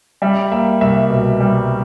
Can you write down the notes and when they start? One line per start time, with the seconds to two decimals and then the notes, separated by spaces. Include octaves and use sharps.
0.22 G3 E5
0.51 A#3 E5
0.81 C2 E5
1.10 B2
1.40 G3